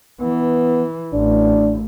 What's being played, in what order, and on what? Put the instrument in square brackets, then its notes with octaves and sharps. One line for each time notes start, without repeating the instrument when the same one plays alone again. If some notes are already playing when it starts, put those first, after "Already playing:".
[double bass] E3 [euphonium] B3
[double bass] A1 [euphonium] D4